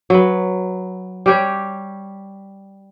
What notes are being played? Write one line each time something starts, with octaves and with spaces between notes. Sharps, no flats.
F#3 B4
G3 G4 C#5